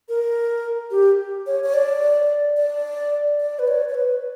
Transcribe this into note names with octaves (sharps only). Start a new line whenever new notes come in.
A#4
G4
C#5
C#5
D5
D5
D5
B4
C#5
C#5
B4